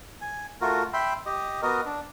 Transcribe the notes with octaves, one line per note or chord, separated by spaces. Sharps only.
G#5
A3 F4 F#4 A#4
E5 G5 B5 C6
G4 D#5
B3 F#4 A#4 D#5
D4